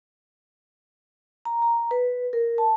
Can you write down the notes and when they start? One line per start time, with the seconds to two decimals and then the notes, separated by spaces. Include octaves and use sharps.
1.45 A#5
1.62 A#5
1.91 B4
2.33 A#4
2.58 A5